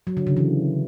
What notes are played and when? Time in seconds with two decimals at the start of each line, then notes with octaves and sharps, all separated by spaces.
0.07 F#3
0.17 D3
0.27 C#3
0.37 E3